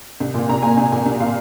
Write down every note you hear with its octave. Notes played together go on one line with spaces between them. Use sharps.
C2
A#2 A#3
C2 A#5
A#2 A#3 G#5
C2 G#5
A#2 A#3 G#5
C2
A#2 A#3 F5